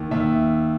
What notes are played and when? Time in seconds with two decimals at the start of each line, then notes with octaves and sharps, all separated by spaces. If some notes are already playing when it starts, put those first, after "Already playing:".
Already playing: D#2
0.11 D#2 E5